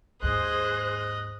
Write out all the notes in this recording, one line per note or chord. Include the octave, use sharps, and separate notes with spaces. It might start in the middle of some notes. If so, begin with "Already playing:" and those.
D#2 G#2 G#4 C5 D#5 F#6